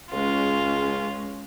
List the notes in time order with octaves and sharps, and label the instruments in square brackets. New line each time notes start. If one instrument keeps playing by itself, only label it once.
[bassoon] C#2 [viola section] G#3 C#4 [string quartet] F4